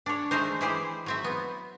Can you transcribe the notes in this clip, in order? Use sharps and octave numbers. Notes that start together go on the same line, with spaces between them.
D4 C#5
G#3 A3 A#4 C5
E3 E4 G4 G#4 C5
F#3 C4 E5
B3